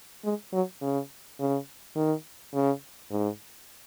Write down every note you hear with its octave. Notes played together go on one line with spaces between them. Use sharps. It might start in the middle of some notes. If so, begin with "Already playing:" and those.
G#3
F#3
C#3
C#3
D#3
C#3
G#2